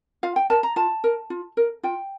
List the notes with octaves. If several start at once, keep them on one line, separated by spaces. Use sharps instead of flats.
F4 F5
G5
A#4 A5
A#5
F4 A5
A#4
F4
A#4
F4 G5